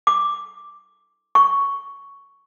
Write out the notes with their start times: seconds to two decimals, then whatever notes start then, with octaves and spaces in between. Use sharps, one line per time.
0.07 D6
1.35 C#6